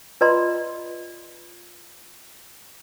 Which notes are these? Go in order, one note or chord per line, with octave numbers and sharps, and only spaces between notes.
F4 B4 D5 D#5 A#5 C6